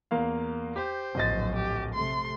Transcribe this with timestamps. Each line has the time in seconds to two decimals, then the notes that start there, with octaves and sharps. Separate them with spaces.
0.11 E2 A#3 F5
0.76 G4 C5
1.15 D1 A#1 F#3 D#5 A6
1.56 G4
1.94 C3 A3 C6